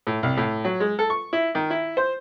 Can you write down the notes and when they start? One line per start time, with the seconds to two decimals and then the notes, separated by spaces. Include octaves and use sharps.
0.07 A2
0.23 C2
0.37 A2
0.64 F#3
0.80 G#3
0.99 A4
1.10 C#6
1.33 E4
1.55 D#3
1.70 E4
1.97 C5